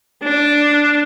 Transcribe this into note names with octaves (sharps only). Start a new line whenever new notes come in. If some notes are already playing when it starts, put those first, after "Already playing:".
D4